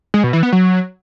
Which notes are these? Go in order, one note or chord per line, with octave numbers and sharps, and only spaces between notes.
G#3
B2
E3
B3
F#3